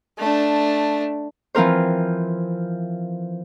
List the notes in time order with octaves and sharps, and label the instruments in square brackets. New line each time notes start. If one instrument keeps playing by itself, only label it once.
[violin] A3 D4
[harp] E3 F3 C4 A#4 C5